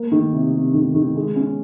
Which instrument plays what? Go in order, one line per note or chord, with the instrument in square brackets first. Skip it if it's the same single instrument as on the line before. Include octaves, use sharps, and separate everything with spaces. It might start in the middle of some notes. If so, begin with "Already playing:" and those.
Already playing: [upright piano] A#3
D#3
C3
C3
D#3
D#3
G#3
C#4